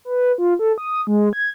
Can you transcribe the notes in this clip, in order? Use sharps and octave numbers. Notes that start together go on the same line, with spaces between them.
B4
F4
A4
D#6
G#3
G#6